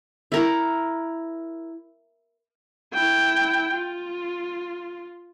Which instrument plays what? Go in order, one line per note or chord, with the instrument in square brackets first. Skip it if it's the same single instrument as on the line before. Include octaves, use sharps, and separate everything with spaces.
[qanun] E4 A#4
[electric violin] E4 G5
F4